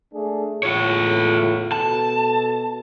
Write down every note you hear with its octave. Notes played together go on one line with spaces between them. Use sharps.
A3 D4 G#4
E2 A2 F4 C#5
B2 A4 A5